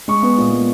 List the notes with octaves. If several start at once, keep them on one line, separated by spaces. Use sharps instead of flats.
G#3 C#6
B3
A#2
G#3